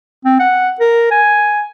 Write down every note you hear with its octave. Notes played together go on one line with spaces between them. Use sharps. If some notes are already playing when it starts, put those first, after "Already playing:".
C4
F#5
A#4
G#5